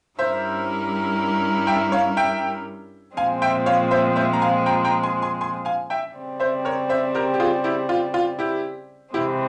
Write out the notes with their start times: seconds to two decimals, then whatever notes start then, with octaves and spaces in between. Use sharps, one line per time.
0.18 G2 G3 C#4 E4 A#4 C5 E5
1.67 E5 G5
1.92 C#5 F5
2.17 E5 G5
3.17 A#2 F3 G#3 C4 F5 G#5
3.42 E5 G5
3.66 C#5 F5
3.91 C5 E5
4.16 C5 E5
4.33 A#5
4.42 F5 G#5
4.66 G5 A#5
4.85 G5 A#5
5.03 G#5 C6
5.22 G#5 C6
5.41 G#5 C6
5.65 F5 G#5
5.90 E5 G5
6.15 C#3 G3 C4
6.40 C5 E5
6.65 A#4 C#5
6.89 C5 E5
7.15 G4 A#4
7.34 G4
7.40 F4 G#4
7.64 E4 G4
7.89 F4
8.14 F4
8.39 E4 G4
9.13 C3 E3 G#3 C4 E4 G4